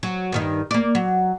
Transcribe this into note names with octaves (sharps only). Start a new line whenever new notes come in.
F#3
G2 D#3 D#4
A#3 D5
F#3